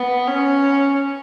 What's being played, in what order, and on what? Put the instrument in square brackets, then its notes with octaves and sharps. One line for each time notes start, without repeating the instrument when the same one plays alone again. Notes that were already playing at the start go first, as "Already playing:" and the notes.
Already playing: [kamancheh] B3
C#4